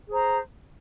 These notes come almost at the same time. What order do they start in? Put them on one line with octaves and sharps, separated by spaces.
G#4 C5 A#5